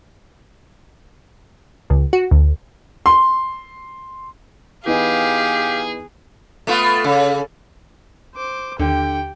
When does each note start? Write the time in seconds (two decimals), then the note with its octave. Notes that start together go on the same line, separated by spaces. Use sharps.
1.90 C#2
2.13 F#4
2.31 D2
3.06 C6
4.86 E3 B3 D#4 G4 G#4 F5
6.67 A3 B3 F4
7.04 C#3
8.36 C5 D6
8.79 D#2 D3 G4 G5